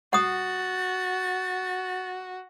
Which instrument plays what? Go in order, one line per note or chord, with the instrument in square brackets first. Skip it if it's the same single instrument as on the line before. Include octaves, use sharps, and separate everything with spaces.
[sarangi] F#4 [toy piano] F#5 D#6 [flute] A6